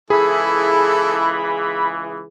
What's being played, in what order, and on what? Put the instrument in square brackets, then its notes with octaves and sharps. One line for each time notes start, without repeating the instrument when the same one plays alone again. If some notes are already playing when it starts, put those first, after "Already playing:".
[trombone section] C#2 E3 [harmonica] E4 A4 [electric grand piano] G#4 [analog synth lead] B5